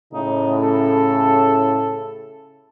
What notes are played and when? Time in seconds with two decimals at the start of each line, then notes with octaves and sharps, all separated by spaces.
0.14 A2 C#3 D#4
0.63 A4